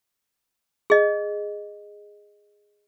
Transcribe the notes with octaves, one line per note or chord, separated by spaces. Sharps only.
G#4 D#5